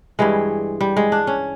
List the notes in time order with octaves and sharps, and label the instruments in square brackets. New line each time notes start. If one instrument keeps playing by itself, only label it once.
[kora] G2 E3 G3 G#3
G3
G#3
D4
C#4